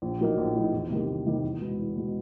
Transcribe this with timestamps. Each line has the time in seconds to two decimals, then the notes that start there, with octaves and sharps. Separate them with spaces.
0.02 A#1
0.20 A2 F#3 A#3 D#4
0.38 A#1
0.55 A2 F#3 A#3 D#4
0.73 E2
0.90 C3 D#3 G3 A#3
1.09 E2
1.26 C3 D#3 G3 A#3
1.43 E2
1.61 B2 G#3 B3
1.79 E2
1.96 B2 G#3 B3